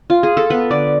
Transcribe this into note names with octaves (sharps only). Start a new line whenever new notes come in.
F4
G#4
A4
B3 B4
D3 D5